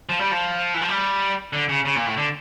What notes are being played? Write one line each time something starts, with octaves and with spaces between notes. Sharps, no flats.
F3
G3
F3
E3
F3
G3
D3
C#3
C#3
A#2
A2
D3